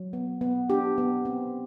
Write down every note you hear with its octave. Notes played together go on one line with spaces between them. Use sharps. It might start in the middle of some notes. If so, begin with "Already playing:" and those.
Already playing: F#3
B3
B3
D4 G4
B3
C4